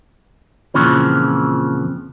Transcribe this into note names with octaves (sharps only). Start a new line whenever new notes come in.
F2 A#2 C#3 E3 F3